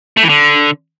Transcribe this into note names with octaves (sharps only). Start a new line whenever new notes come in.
A3
E3
D3